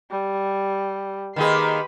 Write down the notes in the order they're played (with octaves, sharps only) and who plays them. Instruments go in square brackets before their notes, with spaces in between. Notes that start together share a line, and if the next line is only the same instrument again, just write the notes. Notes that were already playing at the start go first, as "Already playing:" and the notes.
[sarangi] G3
[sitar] D#3 A#3 G#4 [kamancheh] G4 B4 [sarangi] C6